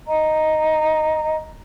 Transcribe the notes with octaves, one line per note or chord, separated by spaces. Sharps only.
D#5 A#5